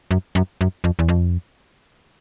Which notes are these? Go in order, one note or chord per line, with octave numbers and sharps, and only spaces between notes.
F#2
F#2
F#2
F2
E2
F2